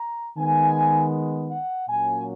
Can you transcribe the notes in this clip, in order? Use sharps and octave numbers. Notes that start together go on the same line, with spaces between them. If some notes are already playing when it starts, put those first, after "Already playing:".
Already playing: A#5
D#3 G#3 B3 G#5
F#5
A#2 F#3 A#3 C#4 G#5